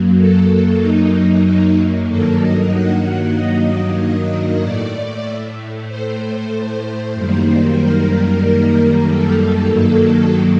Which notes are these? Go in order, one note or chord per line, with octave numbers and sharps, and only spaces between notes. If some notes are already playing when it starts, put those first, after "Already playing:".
Already playing: F#2 F#3 A#3
A4
D#4
D#4
G2 D#3 F#3 A#3 A4
D#5
F#5
D#5
D#5
A2 A3 D5
C5
F#2 D#3 G3 A#3
A#4
A4
G2 D#3 F#3 A#3